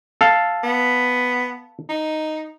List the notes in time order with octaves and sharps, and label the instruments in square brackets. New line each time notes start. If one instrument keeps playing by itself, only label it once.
[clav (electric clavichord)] A4 F5
[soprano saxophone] B3
D#4